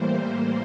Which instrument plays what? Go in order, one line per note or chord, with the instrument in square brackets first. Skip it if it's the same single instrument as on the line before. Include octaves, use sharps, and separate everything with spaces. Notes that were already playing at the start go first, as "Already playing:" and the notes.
Already playing: [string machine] A2 E3 G3 A#3 C5